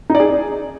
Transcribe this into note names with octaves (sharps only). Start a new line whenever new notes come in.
D#4
D5
G#4